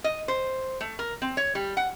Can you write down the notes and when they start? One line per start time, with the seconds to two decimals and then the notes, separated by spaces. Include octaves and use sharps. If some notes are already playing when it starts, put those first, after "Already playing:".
0.04 D#5
0.28 C5
0.81 A3
0.99 A#4
1.22 C4
1.37 C#5
1.55 G3
1.77 F#5